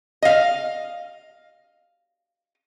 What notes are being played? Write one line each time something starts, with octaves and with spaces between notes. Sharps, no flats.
D#5 F5